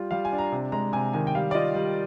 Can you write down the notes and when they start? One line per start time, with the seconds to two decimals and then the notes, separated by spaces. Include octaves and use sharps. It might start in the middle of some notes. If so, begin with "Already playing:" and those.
Already playing: G3 F4
0.11 G3 F5
0.25 G#5
0.32 D4
0.38 A#5
0.52 C3
0.72 G#3 A#5
0.93 C3 G#5
1.13 D#3 G#5
1.27 G5
1.35 G3 F5
1.51 D5
1.54 F4 D#5
1.75 G3